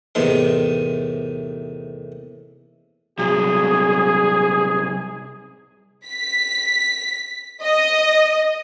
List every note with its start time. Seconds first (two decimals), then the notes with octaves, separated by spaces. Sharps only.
0.15 E2 A2 C3 D#3 C6
3.19 C2 F#3 G#4
6.06 B6
7.63 D#5